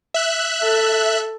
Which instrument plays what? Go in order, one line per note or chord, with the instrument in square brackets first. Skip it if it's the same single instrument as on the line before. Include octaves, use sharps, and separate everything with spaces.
[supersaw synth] E5 F#6
[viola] A4